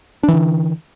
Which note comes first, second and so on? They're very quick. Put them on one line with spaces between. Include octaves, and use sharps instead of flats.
D4 E3 D3